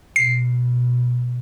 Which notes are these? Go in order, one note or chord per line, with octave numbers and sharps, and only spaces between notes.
B2 C7